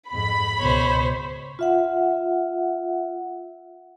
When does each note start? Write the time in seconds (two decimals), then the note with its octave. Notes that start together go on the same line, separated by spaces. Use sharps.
0.12 F2 G#2 B5
0.59 C#2 B2 C5 C#5
1.59 F4 E5 F#5